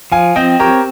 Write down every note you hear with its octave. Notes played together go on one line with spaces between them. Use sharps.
F3 F5 G#5
C4 D#5 G5
G4 A#4 C#5